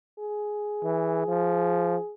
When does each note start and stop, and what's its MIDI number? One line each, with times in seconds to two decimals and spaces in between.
0.19 2.14 68
0.84 1.25 52
1.27 1.96 53